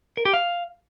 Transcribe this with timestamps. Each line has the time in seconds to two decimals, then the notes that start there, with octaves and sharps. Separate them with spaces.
0.17 A#4
0.25 G4
0.34 F5